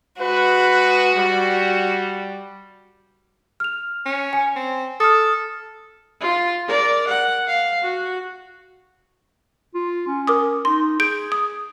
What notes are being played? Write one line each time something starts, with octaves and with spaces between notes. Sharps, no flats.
G#3 F#4 B4
G3
F6 F7
C#4
G#5
C4
A4 D#6 F6
F4
A#4 D5
F#5
F5
F#4
F4
C#4
A#4 D6 D#6
D#4 C6
G#4 G6 D7
D#6